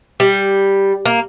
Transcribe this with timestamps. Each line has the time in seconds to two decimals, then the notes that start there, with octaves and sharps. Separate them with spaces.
0.20 G3
1.05 A#3